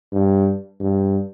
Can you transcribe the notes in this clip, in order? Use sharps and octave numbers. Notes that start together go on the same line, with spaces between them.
G2
G2